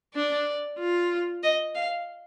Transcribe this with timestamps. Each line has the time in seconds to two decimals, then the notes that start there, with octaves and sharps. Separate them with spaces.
0.15 D4 D5
0.79 F4
1.43 D#5
1.75 F5